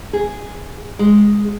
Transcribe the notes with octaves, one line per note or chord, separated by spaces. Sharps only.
G#4
G#3